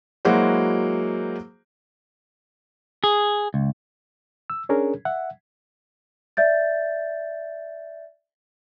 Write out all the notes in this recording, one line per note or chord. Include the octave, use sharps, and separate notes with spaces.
F#3 G#3 A#3 E4 F#4 C5
G#4
C#2
E6
C#4 D4 G#4 A#4 C#5
E5 F#5
D5 E5 G6 A6